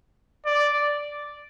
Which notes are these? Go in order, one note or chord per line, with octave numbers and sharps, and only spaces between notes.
D5